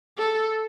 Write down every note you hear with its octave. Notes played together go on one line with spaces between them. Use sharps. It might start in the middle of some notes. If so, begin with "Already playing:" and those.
A4